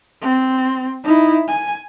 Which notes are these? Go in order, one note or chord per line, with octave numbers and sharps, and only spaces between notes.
C4
D#4 E4
G#5